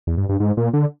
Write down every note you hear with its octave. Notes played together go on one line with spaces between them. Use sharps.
E2
G2
G2
G#2
A#2
D3